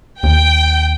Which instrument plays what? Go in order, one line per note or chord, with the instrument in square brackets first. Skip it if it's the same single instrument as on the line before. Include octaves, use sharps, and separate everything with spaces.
[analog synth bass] D#2 [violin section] G5